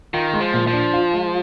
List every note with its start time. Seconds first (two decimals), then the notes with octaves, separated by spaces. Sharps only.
0.13 D#3 F4
0.33 G#3
0.40 F3
0.54 A#2
0.67 F3
0.73 D4
0.94 F4
1.13 G#3